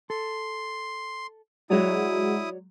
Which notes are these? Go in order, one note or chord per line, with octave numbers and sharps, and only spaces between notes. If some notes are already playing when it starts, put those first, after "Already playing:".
A4 C6
F#3 G#3 E4 F#4 C#5 D5 D#6